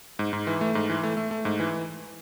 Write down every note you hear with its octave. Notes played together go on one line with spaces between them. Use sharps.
G#2
G#2
E3
A3
G#2
E3
A3
A3
A3
G#2
E3